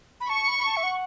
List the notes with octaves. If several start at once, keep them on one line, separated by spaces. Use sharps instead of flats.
B5
A5 C#6
B5
B5
A5
E5
F#5